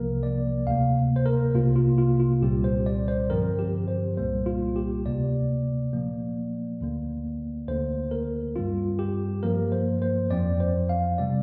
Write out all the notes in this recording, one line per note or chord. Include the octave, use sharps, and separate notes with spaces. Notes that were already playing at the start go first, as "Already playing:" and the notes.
Already playing: C2 C3 F3 A#3 A#4
D5
D2 C3 A#3 F5
C5
A#4
C2 C3 A#3 F4
F4
F4
F4
C2 A#2 G3 C4 G4
C5
D5
C5
G2 D3 F3 C4 A#4
G4
C5
C2 A#2 G3 A#3 C5
F4
G4
D2 C3 A#3 D5
A#2 F3 A#3
D2 D3 A#3
D2 D3 A#3 C5
A#4
G2 G3 C4 F4
G4
G2 F3 A#3 A#4
C5
C5
F2 F3 C4 D5
C5
F5
C3 G3 C4 D5